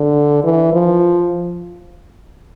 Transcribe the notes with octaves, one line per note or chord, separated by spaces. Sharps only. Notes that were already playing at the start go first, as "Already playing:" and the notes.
Already playing: D3
E3
F3